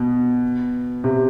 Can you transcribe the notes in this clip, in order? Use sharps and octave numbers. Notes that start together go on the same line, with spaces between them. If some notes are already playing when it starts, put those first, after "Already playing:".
Already playing: B2
C3